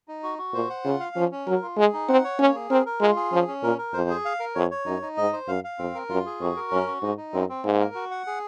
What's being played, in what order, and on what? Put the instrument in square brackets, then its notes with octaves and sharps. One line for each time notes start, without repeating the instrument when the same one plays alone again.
[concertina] D#4
F#4
F#4
[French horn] A#2 [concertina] C5
[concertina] F#5
[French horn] C#3 [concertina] F4
[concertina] F5
[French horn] F3 [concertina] C#4
[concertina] C#4
[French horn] F#3 [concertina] A#4
[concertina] F4
[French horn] G#3 [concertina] G#4
[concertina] D#4
[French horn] C4 [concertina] F#5
[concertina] C#5
[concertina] A#3 [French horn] C#4
[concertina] G#4
[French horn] C4 [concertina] A#4
[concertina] A#4
[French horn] G#3 [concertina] F4
[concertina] G#4
[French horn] F3 [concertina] C#4
[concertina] C#4
[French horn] A#2 [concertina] A#4
[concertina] A#4
[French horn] F2 [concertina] C5
[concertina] G#4
F5
A#4
[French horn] F2 [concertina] C#5
[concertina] C#5
[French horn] F#2 [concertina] D#4
[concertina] D#4
[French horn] G#2 [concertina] D#5
[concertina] C5
[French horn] F#2 [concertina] F5
[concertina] F5
[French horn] F2 [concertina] C4
[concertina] A#4
[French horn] F#2 [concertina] F4
[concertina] G#4
[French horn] F2 [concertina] F#4
[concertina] A#4
[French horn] F#2 [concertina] C#4
[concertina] F#4
[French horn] G#2 [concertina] D#4
[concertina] D#4
[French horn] F#2 [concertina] C4
[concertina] C4
[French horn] G#2 [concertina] A#3
[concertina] A#4
F#4
F#5
G#4